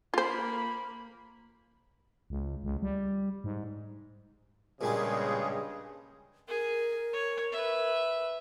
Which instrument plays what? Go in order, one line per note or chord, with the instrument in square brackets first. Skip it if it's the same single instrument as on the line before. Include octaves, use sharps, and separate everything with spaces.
[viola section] A#3 B5 [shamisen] F4 C5
[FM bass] C#2
C#2
G3
G#2
[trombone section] G2 C#3 G#3 [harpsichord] A#2 G3 D4 [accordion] G#4
[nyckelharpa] G#4 [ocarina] A#4
[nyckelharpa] C#5
B4 E5